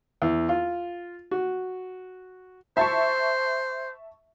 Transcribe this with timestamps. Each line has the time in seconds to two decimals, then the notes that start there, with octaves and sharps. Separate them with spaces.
0.22 E2
0.49 F4
1.31 F#4
2.77 C5 E5 A5 C#6